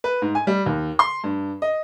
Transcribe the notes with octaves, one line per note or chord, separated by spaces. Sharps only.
B4
G#2
G#5
G3
D#2
C6
G2
D#5